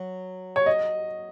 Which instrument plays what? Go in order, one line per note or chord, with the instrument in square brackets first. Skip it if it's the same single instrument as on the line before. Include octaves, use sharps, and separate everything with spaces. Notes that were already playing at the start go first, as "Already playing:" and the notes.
Already playing: [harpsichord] F#3
[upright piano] C#5
D#5